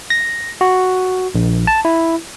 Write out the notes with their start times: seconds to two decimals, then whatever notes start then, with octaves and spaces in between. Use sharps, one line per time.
0.10 A#6
0.61 F#4
1.35 A#1
1.67 A5
1.85 E4